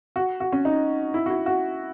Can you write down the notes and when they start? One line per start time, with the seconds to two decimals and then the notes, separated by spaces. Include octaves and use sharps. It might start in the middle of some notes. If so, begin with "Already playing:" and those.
0.16 F#4
0.40 F#4
0.52 C#4
0.65 D#4
1.14 E4
1.26 F#4
1.30 E4
1.46 F#4